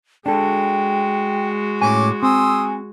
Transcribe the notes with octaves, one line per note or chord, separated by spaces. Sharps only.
G#3 D4 F#4 A4 G5
A2 C#4 G#5 D6
C4 G#5 C6 D#6 E6